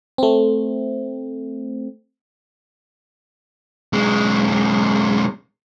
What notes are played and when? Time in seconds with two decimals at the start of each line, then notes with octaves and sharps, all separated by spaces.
0.18 A3 C4
3.93 B1 G#3